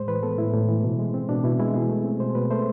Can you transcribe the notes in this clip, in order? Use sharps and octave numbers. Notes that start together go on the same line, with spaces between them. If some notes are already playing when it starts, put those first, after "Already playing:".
Already playing: A2 G#3 C5
E3 B4
B3 A4
A2 E4
A2
E3
B2
G#3
C4
B2 D4
B2 E4
G#3 E4
B2 G#4
A3
C4
B2 C5
B2 B4
A3 C5